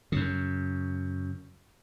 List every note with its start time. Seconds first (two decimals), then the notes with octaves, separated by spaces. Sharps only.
0.12 F#2 C#3